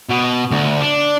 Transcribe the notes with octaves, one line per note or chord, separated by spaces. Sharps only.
B2
D2
D4